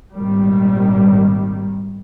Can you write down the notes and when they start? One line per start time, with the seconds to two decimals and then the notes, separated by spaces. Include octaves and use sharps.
0.15 G#1 A#2 D#3 G3